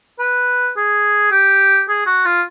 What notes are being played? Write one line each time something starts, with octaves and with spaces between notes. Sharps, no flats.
B4
G#4
G4
G#4
F#4
F4